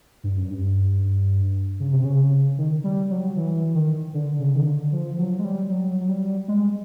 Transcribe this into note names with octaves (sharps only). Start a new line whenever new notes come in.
G2
F#2
G2
C#3
C3
C#3
D#3
G3
F#3
E3
D#3
D3
C#3
D#3
D3
F3
F#3
G#3
G3
F#3
F#3
G3
G#3